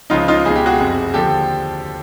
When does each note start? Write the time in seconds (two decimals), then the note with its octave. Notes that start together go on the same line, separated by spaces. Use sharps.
0.10 C#2 C#3 F3 D#4 F4
0.28 D#4 F4
0.45 C#2 B2 G#4
0.55 G4
0.66 F#4 G#4
0.80 F#1 F2 C3
1.14 D#2 D3 F3 G4 A4